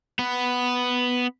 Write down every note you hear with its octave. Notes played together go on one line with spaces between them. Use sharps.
B3